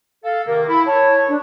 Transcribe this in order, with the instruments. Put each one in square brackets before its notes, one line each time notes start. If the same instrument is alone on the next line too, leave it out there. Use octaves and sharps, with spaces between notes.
[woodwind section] A4 [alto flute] F5
[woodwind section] C3 D#3 A#3 [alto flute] A#4
[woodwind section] E4 [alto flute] B5
[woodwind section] C#5 [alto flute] A5
[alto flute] D4